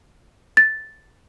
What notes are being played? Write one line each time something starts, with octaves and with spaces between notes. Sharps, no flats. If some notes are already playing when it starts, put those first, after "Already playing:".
A6